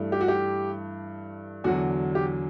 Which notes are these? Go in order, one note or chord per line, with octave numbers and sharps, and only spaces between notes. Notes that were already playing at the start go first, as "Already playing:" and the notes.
Already playing: G2 E3 A3
G4
F#4
G4
E2 D3 F#3 F#4
G4